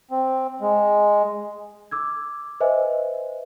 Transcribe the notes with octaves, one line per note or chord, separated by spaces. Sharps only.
C4
G#3
D6 E6 G#6
B4 C5 D#5 E5 G#5